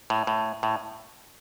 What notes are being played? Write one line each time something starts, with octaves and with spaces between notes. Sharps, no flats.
A2
A2
A2